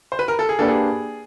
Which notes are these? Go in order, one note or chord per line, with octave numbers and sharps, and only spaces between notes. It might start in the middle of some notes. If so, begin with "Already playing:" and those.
C5
B4
A#4
A4
G#4
A#3 D4 G4 A4 B4 D5
G#4